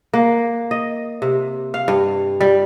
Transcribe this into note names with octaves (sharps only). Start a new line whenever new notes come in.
A#3
D#5
C3
F5
G2
G3